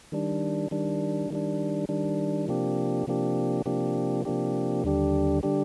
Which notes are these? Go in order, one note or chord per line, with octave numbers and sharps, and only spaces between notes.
D#3 G3 D4
D#3 G3 D4
D#3 G3 D4
D#3 G3 D4
C3 F3 A#3 D4 G4
C3 F3 A#3 D4 G4
C3 F3 A#3 D4 G4
C3 F3 A#3 D4 G4
D#2 D3 G3 D4 G4
D3 G3 D4 G4